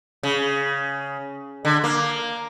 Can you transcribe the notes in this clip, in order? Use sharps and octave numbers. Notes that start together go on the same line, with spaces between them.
C#3
D3
A#3